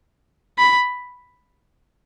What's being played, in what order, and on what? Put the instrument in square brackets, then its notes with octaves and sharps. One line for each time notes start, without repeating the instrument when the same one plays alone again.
[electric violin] B5